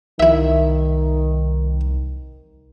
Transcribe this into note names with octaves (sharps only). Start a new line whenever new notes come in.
C2 D#3 E4 E5